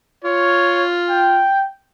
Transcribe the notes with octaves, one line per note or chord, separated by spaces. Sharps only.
F4 C#5
G5